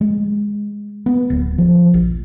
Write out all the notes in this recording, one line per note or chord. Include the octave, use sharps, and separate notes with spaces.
G#3
B3
D1
F3
A#1